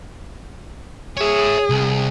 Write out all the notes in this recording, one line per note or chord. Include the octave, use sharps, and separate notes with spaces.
G#4 C#5 E5
C2